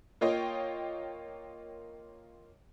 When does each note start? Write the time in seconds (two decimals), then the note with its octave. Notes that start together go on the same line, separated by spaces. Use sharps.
0.21 A#3 F4 C#5 D#5 G5